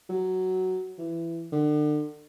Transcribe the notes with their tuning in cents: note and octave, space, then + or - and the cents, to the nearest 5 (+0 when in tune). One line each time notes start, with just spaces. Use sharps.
F#3 +5
E3 +20
D3 +35